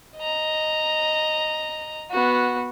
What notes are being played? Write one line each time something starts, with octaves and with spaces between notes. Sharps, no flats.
D#5 A#5
B3 F#4